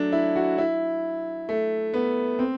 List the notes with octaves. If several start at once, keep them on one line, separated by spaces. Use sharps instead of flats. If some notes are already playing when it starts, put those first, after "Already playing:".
Already playing: F#3 A3 D4
E4
F#4
E4
A3
B3
C4